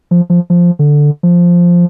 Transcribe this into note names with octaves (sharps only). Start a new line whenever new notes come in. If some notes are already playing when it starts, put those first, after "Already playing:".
F3
F3
F3
D3
F3